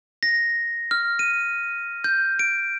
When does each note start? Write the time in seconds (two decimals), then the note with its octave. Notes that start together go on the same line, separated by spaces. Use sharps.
0.23 A#6
0.91 F6
1.19 D#7
2.04 G6
2.39 D7